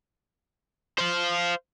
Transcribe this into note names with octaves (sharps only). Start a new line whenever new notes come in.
C5 F5